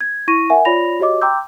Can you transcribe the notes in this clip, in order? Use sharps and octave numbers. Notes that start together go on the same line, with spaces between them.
G#6
E4 C#6 A#6 D#7
A#4 E5 F#5 G#5
F4 C#5 D5 B5 A#6 F7
F#4 G4 C#5 D#5 D6
G5 A#5 C6 D6 E6 G6